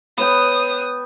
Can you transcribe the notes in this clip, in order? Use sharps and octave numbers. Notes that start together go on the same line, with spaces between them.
B3 C#5 G5 D#6